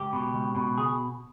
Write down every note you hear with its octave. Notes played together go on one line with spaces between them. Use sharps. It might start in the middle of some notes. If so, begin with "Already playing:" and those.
Already playing: C#2 G4
B2
C#2
B2
G#4